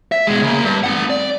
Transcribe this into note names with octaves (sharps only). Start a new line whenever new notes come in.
E5
B2 G#3
C#3 A#3
G2
C4 F#5
D5